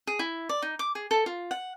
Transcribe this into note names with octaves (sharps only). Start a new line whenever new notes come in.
G#4
E4
D5
D#4
D6
G#4
A4
F4
F#5